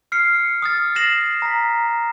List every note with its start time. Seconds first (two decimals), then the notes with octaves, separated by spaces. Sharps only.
0.12 F6 C7 C#7
0.62 D#6 F6 A6
0.95 A6 A#6 C7 E7 F#7
1.42 A#5 B6